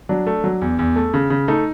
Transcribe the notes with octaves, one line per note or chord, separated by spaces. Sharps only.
F#3 D4
A3
F#3
E2
E2
A3
C#3
C#3
A3 D#4